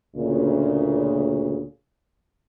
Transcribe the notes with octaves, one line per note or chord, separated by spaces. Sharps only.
D2 A#2 C#3